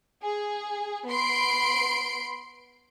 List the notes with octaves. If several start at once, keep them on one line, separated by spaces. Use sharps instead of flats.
G#4
B3 B5 C6 C7 D7